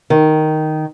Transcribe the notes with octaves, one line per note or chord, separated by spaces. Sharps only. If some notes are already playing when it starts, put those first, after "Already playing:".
D#3